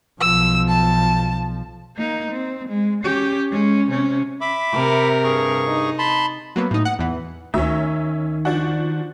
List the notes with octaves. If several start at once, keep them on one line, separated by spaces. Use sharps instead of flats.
B1 F3 E6
A5
A#3 D#4
C4
G#3
C#4 G4
G#3 C#4
C3 C#4
E5 B5 D6
C3 A#4
G2 G#4 C#6
D#4
A5 B5 C6
F#3 A#3 B3
A2 D#4
F#5
E2 E3
D2 D#3 C#4 E5
F3 D4 F#4